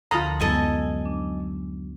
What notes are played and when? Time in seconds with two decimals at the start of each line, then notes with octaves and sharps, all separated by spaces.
0.11 D2 D3 F3 F4 A4 A#5 B5 D#6
0.40 F#2 F#3 G#3 B3 E4 A4 D#5 G#5
1.06 D4